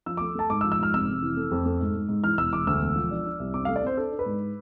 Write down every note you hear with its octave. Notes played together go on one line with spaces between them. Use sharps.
F3 E6
D6
A3
A3 A5
G#2 D6
E6
F3
E6
G#2 F6
F1 E6
F1
E3
A3
F2
A3
G#2
G#2
G#2
E3 F6
E1 E6
E1 D6
D2 E6
E1
F3
D4
D4
C2
C4 D6
F5
A3
D5
C4 C5
D4 A4
D4
B4
G#2